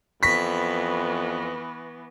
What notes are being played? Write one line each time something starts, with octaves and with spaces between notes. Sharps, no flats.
F2 E3 B3 B5 C#6 A#6 B6